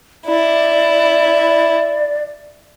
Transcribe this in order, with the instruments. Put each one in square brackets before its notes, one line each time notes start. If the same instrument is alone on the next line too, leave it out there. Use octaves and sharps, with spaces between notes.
[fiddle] E4 [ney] D5